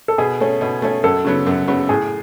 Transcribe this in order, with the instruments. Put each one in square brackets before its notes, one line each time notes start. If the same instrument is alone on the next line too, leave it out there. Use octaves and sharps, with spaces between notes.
[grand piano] A4
[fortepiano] B2 [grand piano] G#4
[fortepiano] A3 C#4
B2
A3 C#4
[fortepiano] F#2 [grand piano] A4
[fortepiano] C#3 F#3 B3
F#2
C#3 F#3 B3
[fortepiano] A2 [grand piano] G#4